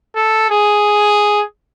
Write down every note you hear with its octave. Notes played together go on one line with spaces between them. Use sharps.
A4
G#4